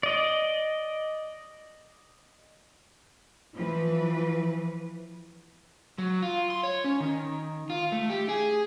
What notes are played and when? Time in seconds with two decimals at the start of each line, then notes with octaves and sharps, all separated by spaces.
0.03 D5 D#5
3.55 E3 F3 B4
5.98 F#3
6.22 F4
6.50 C6
6.63 C#5
6.84 C#4
7.00 D#3
7.70 F4
7.92 A3
8.10 G4
8.29 G#4